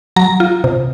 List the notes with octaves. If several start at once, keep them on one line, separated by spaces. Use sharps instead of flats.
F#3 A#5
F4
C3